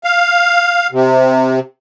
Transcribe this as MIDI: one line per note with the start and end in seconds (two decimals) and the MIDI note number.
0.04 0.87 77
0.92 1.59 48